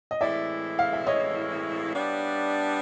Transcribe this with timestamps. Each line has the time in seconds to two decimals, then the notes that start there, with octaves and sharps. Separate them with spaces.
0.11 D#5
0.21 A2 E3 G#3 C4 E4 D5 E5
0.79 F5
0.93 E5
1.07 C#5 D#5
1.93 G3 B3 D4